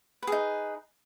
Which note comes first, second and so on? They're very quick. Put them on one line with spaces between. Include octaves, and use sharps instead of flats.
B4 G#4 D#4